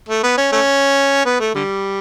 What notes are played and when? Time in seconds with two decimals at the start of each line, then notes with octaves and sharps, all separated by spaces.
0.08 A3
0.23 B3
0.37 C#4
0.52 A3 C#4
1.25 B3
1.39 A3
1.55 D3 G3